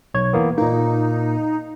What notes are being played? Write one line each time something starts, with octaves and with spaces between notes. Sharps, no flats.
B1 C#5 G#6
E3 A#3 B3
A#2 A#3 D#4